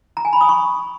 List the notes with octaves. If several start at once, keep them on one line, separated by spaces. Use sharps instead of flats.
A#5
G#5
B5
D#6
C#6